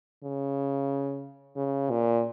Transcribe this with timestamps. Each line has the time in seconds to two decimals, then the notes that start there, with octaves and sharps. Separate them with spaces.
0.24 C#3
1.56 C#3
1.90 A#2